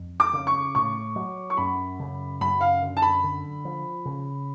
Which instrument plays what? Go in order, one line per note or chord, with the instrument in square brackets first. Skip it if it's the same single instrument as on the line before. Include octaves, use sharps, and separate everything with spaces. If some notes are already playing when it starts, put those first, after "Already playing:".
Already playing: [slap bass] F2
[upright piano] D6
[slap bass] C#3
[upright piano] C#6
[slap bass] A2 [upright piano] C#6
[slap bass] F#3
[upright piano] C#6
[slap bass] F#2 [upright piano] B5
[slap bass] C#3
[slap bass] F#2 [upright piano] B5
[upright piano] F5
[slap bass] D3
[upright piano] A5
B5
[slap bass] D3
F3
C#3